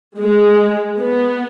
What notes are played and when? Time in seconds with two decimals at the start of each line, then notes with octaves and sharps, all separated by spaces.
0.19 G#3
0.99 B3